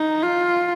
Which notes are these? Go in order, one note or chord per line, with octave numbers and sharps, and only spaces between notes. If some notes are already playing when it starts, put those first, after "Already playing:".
Already playing: D#4
F4